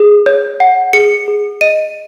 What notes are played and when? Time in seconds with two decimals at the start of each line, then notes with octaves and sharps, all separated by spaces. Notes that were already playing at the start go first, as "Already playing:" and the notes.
Already playing: G#4
0.26 C#5
0.60 F#5
0.93 G#4 C#7
1.28 G#4
1.61 D#5 D#7